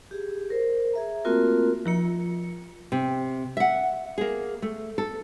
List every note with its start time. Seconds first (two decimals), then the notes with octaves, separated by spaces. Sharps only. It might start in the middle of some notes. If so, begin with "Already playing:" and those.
0.11 G4 G#4
0.50 A#4 C5
0.93 G#4 E5 A#5
1.25 A3 A#3 C4 F4 F#4 A#4
1.86 F3 F4 C#7
2.92 C3
3.57 E5 F#5
4.18 A#3 G#4
4.62 A3
4.98 A4